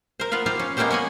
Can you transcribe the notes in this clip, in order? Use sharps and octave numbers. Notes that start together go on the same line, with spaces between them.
A#4 C5
B3 F4 A#4 B4 F5
F4 G4 C5 F5
C#4
G#3 A#3 B3 C#4 G4 C5
C#4 A#4 F#5 G#5